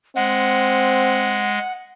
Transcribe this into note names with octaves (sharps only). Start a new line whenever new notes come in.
G#3 C4 F#5